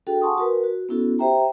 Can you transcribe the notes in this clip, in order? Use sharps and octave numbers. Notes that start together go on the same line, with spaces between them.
D4 F#4 G#4 A4 G5
F#5 G#5 A5 C6 C#6 D#6
F#4 A#4 B4
F#4
B3 C#4 E4 F#4 A4
G4 C5 E5 G5 A#5